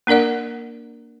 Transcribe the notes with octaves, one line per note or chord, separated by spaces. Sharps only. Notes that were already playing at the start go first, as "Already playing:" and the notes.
A#3 D4 A#4 D5 F#5